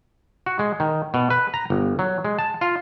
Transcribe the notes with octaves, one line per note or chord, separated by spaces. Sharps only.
F#4
G#3
D#3
B2
B4
A#5
G1
F#3
G#3
A5
F4